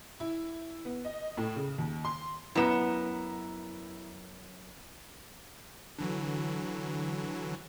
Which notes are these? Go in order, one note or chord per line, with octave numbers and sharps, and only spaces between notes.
E4
B3
D#5
A2
C#3
D#2
C6
F#2 B3 E4 A#5 E7
D3 E3 F#3